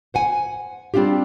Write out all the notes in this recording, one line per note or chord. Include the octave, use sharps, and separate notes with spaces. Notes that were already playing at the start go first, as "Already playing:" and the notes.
C5 F#5 G#5
G3 C4 D4 F4 G4